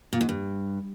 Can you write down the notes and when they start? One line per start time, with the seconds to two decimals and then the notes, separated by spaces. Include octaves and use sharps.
0.13 A#2
0.21 G#2
0.29 G2